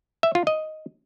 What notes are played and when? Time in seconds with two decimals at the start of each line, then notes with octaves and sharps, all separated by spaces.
0.23 E5
0.35 F4
0.47 D#5